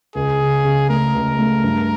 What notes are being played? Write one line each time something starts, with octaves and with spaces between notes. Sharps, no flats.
C#2 G#4
C#3
C#3
A3 A#4
C#2
A3
G2